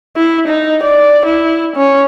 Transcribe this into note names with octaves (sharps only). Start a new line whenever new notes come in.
E4
D#4
D5
E4
C#4